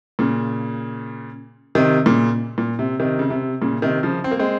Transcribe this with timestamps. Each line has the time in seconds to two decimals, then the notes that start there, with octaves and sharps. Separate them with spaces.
0.19 A#2 C#3
1.75 C3 D#3
2.06 A#2 C#3
2.58 A#2
2.79 C3
2.99 C3 D#3
3.19 C#3
3.30 C3
3.62 A#2 C#3
3.82 C3 D#3
4.03 C#3 F3
4.24 C4
4.31 A#3
4.39 G#3 C4